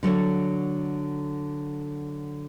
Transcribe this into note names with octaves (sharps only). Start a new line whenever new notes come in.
D3 F#3 A4 C#5